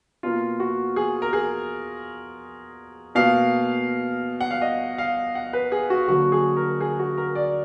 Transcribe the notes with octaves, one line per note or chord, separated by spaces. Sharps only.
B2 A#3 F4
F#4
G#4
A#4
G#4
B2 A#3 F5
F#5
F5
D#5
F5
F#5
B4
G#4
F#4
D3 F#3 A#3 F#4
G#4
A#4
G#4
F#4
A#4
D5